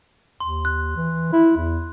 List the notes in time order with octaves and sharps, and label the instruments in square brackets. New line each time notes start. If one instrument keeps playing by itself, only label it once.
[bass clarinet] D#2 [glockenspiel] C6
[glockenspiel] F#6
[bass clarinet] E3
E4
E2